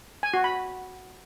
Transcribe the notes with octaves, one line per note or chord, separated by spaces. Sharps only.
G#5
F#4
B5